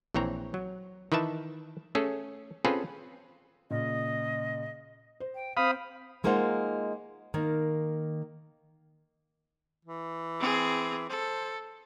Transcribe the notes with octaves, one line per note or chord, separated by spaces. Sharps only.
A#1 E3 C4 C#5 A#5
F#3
D#3 E3 B4 E5 A5
A3 C#4 G#4 A4
C4 C#4 F4 G#4 A4 B4
A#2 C#3 D#5
C5
G5
C4 C5 F5 B5 D#6
G#3 A#3 D#4 F4 C5 F#5
D#3 A#3
E3
C4 G#4
A4 C5